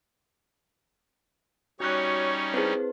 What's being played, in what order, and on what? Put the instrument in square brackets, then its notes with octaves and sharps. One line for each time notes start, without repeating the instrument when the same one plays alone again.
[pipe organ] G3 C#4 D#4 [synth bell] F#4 F#6 [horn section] C#5
[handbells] C4 E4 C5 [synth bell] G#4 B4